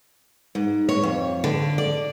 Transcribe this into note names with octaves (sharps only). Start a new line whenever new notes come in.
G#2
C#5
F2
D3
D5